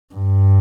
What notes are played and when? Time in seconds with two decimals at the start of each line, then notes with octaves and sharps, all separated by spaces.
0.15 G2